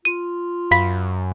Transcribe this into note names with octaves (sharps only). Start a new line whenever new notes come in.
F4 D#7
F#2 F5 B5 B6